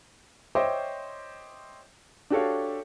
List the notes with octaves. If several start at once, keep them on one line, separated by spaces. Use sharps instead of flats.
C5 C#5 D#5 E5 G5 D6
D4 F#4 G4 A4 C#5 F5